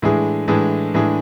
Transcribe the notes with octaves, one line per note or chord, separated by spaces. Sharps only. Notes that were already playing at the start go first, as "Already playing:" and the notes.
A2 E3 G#3 D4 G#4
A2 E3 G#3 D4 G#4
A2 E3 G#3 D4 G#4